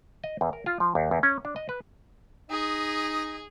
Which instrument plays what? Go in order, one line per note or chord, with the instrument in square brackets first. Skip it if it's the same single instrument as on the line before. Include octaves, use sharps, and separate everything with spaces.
[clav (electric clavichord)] D#5
E2
A#4
F4
F3
D#2
E2
C#4
D4
D#5
B4
[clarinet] D#4 [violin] G#4 [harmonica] D#5